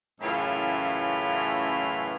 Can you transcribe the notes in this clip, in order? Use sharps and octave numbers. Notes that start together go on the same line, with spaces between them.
F#2 A2 C#3 E3 E4 F4